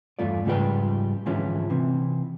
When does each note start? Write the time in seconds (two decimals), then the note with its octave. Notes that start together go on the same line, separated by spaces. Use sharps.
0.19 E2 G2 A3 F4 D5
0.45 G#2 C#3 F3 G3 B4 G5
1.26 G#2 D3 E3 F3 C#4 E4
1.70 C3 E3